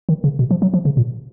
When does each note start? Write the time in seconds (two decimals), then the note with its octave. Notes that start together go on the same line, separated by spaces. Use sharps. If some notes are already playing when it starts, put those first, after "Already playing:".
0.09 D#3
0.24 C#3
0.39 B2
0.51 F3
0.62 F#3
0.74 F3
0.85 C#3
0.97 A#2